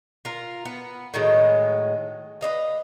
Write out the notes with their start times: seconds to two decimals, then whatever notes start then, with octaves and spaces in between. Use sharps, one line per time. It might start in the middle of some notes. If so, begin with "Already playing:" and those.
0.25 F4 A#4
0.65 B3
1.14 A2 D#3 F#3 G#3
2.41 B4 C5 D#5 F5